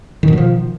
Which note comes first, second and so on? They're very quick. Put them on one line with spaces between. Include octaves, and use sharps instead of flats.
D#3 B2 F#3 F3